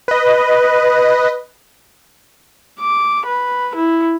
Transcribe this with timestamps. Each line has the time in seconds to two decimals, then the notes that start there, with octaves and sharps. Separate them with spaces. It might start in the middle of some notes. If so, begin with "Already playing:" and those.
0.08 B4 D#5
2.80 D6
3.26 B4
3.75 E4